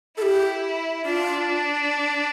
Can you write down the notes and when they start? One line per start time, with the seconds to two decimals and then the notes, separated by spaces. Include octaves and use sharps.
0.17 E4 G4 A4
1.06 D4 F4